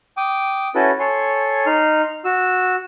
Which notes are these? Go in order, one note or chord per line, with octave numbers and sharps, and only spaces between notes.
G5 D6 D#6
C#4 E4 F#4 A4 B4
A4 C#5 G#5 C6
D#4 C6 F6
F#4 E6